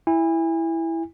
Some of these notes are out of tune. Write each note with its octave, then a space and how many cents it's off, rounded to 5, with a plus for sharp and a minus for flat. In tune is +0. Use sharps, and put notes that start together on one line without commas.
E4 +0 G#5 -35